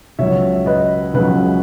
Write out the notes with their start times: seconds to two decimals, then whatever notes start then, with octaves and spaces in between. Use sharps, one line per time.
0.19 C#2 C#3 F#3 C#5 E5
0.66 B4 D#5
1.14 C#2 C#3 F#3 B4